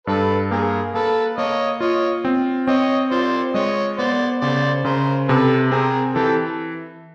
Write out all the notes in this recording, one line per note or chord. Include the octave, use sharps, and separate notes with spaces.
G2 A4 B4
A#3 G#4 A#4
A#3 A4 B4
A#3 C#5 D#5
F4 C#5 D#5
C4
C4 C#5 D#5
F4 C5 D5
G#3 C#5 D#5
B3 C5 D5
C#3 C5 D5
C#3 A#4 C5
C3 A4 B4
C4 G#4 A#4
E3 G4 A4